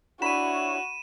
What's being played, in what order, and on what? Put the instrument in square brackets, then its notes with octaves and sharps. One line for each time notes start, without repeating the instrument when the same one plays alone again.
[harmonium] D4 E4 C#5 [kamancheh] F#4 [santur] B5 [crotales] D#7 E7